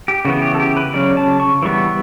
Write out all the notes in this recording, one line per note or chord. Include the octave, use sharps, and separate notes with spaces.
G4
C#3 E3 B3 F#4
G4
A4
G4
B4
C#3 F#3 C#4 D5
A5
C#6
E3 G3 B3 C#6